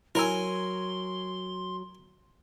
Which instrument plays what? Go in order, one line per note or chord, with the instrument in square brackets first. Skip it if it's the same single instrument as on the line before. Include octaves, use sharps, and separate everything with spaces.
[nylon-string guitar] F#3 [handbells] E4 A#5 E6 [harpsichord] A#4 G#5 [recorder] C6